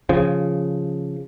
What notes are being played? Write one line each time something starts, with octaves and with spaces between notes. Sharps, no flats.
C#3 F3